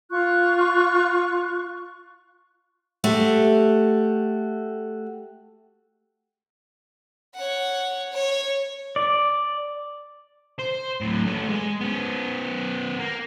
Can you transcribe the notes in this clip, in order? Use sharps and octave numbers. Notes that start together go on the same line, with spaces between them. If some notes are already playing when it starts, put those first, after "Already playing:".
F4 C#6 F#6
A3 F#4 G4
C#5 F#5
C#5
D5
C5
A2 F#3
A3 C#4
G#3
B3 C#4
A#3